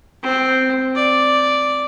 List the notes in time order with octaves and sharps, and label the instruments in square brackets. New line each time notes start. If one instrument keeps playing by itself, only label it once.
[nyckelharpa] C4
D5